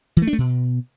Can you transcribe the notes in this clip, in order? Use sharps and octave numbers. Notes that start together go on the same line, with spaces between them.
E3
A3
D4
A3
B2